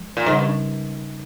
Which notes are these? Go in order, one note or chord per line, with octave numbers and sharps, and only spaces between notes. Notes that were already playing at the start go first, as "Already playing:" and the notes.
Already playing: F3 G#3
A#2
G#2 C#3 G3 C#4
G2